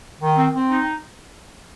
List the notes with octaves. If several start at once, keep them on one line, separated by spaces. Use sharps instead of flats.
D#3
C4
C4
D#4